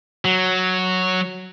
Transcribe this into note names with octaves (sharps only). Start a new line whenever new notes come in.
F#3